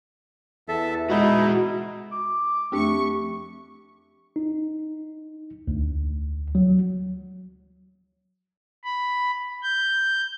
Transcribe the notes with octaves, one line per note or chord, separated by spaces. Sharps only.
E2 A4 E5
G#3 D#4 E4 F#4 D#5
D6
F2 A3 C4 D4 G4 C#6
D#4
D2
F#3
B5
G6